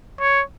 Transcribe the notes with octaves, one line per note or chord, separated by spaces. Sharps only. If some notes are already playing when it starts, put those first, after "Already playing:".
C#5